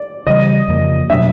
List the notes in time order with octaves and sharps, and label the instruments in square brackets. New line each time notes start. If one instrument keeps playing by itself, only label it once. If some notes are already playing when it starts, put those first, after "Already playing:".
Already playing: [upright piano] D5
[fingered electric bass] C#3 E3 G3 [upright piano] D#5
[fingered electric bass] F2 C#3 F3 A#3
[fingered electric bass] B2 F#3 A3 D4 [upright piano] E5